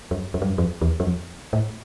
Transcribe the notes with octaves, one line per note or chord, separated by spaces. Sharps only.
F#2
F#2
G2
F#2
F2
E2
F#2
F2
A2